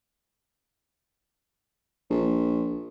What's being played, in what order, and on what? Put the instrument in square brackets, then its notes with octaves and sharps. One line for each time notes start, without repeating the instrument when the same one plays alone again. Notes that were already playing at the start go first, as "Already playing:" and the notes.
[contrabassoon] A#1